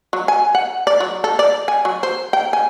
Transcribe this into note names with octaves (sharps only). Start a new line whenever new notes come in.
F#3
G#5
F#5
D5
F#3
A4
D5
G#5
F#3
C5
G5
G#5